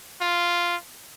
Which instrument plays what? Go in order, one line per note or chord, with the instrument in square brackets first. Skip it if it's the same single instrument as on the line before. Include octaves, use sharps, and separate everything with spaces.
[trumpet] F4